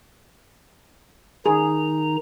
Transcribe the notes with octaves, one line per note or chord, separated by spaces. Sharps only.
D#3 D#4 G#4 A#5